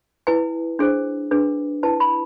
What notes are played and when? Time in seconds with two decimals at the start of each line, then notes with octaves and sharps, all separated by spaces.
0.27 E4 B4 G#5
0.79 D4 G#4 C5
1.31 D4 G#4 B4
1.83 E4 B4 A5
2.00 B5